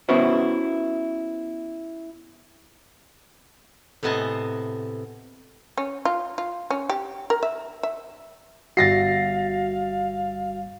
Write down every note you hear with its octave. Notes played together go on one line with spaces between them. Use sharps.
B3 C#4 E4 F#4 B4 C5
A2 C3 B3 D#5 G#5 A5
C#4
F4
F4
C#4
G4
A#4
E5
E5
G1 G3 F#4 E5 F5 A6 A#6 C7